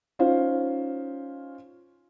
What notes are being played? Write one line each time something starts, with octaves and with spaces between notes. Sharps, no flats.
C#4 D#4 F4 C5 F5